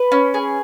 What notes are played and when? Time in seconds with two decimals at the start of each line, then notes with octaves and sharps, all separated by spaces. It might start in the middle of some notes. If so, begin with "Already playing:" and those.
Already playing: B4
0.12 C#4
0.34 G#4